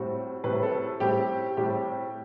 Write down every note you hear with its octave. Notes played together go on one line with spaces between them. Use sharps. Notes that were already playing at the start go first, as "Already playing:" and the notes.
Already playing: A2 G3 C4 F#4
A2 G3 C4 B4
A4
A2 G3 C4 G4
A2 G3 C4 G4